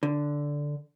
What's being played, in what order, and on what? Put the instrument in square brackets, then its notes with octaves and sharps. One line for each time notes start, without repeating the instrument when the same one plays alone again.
[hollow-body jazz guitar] D3